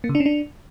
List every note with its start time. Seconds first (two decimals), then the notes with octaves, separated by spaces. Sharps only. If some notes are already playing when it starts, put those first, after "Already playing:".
0.04 A#3
0.09 C#3
0.15 D4
0.20 C#4
0.26 D4